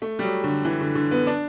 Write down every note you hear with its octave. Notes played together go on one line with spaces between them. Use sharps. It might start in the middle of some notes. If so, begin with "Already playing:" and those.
A3
G3
F#3
D3
E3
D3
D3
B3
D4